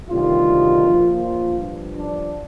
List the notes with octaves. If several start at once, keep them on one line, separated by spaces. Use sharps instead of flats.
D2 C3 D#3 G3 F4
A#1 A#2 F3
F4
G2 F3
D4